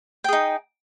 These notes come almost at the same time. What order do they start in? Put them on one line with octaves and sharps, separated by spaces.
G5 G#4 D#4